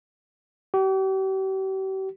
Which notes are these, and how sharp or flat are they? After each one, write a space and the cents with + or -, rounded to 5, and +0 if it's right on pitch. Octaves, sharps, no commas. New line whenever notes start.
G4 -40